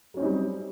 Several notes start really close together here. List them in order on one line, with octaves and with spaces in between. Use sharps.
F#3 C#4 C4 D#4 G3